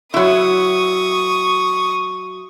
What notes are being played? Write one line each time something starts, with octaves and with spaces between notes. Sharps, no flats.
F#3 E4 C#6 D#6